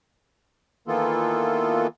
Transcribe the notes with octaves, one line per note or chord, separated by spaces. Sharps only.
D#3 E3 A#3 B3 F4 A4